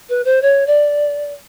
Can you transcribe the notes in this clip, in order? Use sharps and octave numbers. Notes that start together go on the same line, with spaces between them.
B4
C5
C#5
D5